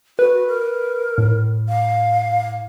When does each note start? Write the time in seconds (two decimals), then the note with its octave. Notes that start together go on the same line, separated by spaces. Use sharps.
0.19 F#4 B4
0.48 A#4
1.18 A2
1.69 F5